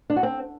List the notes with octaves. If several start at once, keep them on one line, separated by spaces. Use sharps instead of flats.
D4
F#4
C4